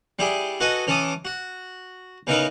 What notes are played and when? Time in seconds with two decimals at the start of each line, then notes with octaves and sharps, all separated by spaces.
0.19 G3 E4 G4 G#4
0.60 F#4 A4 B4 D#5 F#5 G#5
0.87 E3 C#4 A4 A5 D6 D#6
1.25 F#4
2.27 C#3 B3 D#4 E4 A#4 B4